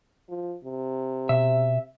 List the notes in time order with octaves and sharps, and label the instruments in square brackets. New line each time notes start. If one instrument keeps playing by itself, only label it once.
[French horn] F3
C3
[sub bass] B2 [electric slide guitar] E5